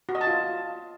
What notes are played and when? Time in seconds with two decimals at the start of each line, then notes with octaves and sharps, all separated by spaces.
0.09 F#4
0.15 D#5
0.21 A5
0.27 F4